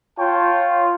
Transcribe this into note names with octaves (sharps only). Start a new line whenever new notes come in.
F4 C#5 G5 A5